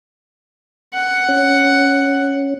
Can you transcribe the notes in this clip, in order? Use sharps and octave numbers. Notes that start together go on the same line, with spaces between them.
F#5
C#4